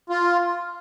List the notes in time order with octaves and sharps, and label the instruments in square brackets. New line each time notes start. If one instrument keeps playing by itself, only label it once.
[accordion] F4